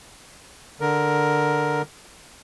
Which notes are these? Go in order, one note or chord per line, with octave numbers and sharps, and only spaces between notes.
D3 A#4